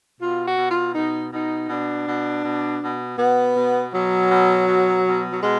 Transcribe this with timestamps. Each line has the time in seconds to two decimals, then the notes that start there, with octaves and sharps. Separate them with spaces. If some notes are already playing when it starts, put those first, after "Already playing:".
0.20 B2 F4
0.45 F#4
0.58 B2
0.70 F4
0.94 B2 D#4
1.32 B2 D#4
1.69 B2 D4
2.07 B2
2.45 B2
2.82 B2
3.18 B2 B3
3.57 B2
3.94 B2 F#3
4.32 B2
4.68 B2
5.06 B2
5.32 F#3
5.43 B2 G#3